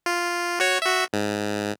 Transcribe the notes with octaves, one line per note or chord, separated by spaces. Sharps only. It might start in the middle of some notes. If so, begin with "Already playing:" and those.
F4
F#4 C#5
F#4 E5
G#2